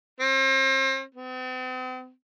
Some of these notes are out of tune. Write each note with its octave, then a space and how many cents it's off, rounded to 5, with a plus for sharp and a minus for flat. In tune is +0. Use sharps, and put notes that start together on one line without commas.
C4 +40
C4 -45